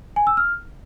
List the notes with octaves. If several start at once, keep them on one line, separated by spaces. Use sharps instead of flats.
G#5
E6
F6